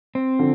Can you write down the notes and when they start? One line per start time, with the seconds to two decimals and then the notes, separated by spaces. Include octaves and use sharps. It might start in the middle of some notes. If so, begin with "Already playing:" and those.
0.15 C4
0.39 D3 F3